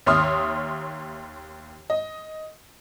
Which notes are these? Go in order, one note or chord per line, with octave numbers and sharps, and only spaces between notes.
D#2 C#5 E5 C6 D#6 F6
D#5